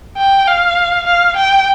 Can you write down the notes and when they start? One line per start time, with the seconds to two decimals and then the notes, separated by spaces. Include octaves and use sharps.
0.17 G5
0.47 F5
1.07 F5
1.37 G5